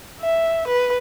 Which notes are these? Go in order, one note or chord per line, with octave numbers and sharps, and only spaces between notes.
E5
B4